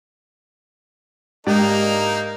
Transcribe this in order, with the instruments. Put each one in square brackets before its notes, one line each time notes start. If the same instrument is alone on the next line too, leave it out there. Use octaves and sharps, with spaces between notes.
[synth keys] G#2 D4 G4 [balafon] G#3 [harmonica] A#3 D#4